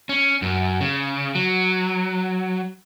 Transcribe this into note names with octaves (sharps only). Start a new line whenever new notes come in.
C#4
F#2
C#3
F#3